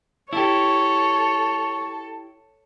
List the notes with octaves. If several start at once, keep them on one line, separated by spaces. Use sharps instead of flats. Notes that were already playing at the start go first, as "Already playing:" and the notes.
E4 G4 A4 C#5